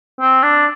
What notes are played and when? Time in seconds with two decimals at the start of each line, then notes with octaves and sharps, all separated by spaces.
0.20 C4
0.43 D4